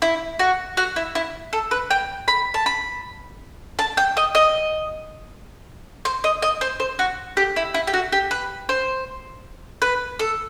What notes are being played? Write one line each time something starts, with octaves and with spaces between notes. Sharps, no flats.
E4
F#4
F#4
E4
E4
A4
B4
G5
B5
A5
B5
A5
G5
D#5
D#5
C5
D#5
D#5
C5
C5
F#4
G4
E4
E4
G4
F#4
G4
B4
C5
B4
A4